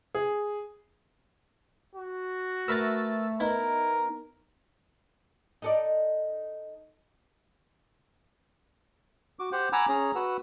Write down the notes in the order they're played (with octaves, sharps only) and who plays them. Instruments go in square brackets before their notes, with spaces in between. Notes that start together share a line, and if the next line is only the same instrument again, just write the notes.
[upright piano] G#4
[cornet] F#4
[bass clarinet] A3 [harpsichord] A#4 B4 E5 [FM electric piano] E6 A6
[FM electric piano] B3 D#4 [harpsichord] E4 [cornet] A#4
[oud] D#4 A4 D5
[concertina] F#4 D6
G4 C5 F#5
F#5 G#5 A#5 B5 D6 E6
C#4 G#4 C#5 A#5
F#4 B4 F#5 E6